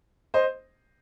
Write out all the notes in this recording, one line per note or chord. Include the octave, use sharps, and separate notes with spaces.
C5 D#5